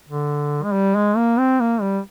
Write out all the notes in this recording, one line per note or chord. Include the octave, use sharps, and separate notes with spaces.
D3
G#3
G3
G#3
A#3
C4
A#3
G3